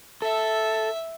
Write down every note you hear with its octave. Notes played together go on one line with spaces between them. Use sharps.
A4 E5